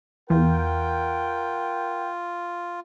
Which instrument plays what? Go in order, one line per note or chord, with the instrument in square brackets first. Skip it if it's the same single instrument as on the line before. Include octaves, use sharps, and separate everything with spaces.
[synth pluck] E2 [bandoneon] F4 [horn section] A#4 F#5 G5